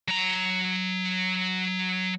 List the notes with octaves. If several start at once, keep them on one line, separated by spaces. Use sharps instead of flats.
F#3 A#5